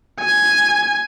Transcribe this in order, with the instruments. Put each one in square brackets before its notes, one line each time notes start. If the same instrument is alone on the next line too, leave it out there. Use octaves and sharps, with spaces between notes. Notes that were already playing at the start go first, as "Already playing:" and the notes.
[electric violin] G#5